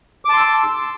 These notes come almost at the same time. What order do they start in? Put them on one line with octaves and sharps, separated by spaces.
D6 A5 C6 E6